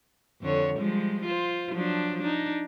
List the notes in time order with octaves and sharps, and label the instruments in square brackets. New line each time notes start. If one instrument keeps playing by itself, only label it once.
[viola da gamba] F2 D3 C#5
F3 G3 G#3
F4 C5
F3 F#3 D4
D4 D#4